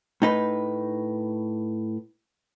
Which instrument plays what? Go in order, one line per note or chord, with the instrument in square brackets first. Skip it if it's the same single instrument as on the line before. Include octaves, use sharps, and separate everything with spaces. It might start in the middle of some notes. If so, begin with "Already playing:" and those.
[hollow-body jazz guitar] A2 D#4 B4